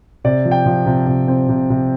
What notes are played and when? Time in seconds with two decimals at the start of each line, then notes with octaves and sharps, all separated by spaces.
0.24 C3 D5
0.45 F3
0.51 G5
0.66 F3
0.86 C3
1.07 C3
1.28 C4
1.49 C3
1.70 C3